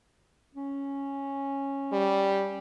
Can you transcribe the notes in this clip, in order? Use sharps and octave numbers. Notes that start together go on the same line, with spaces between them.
C#4
G3